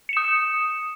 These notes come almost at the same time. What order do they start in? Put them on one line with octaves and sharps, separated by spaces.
C#7 E7 D#6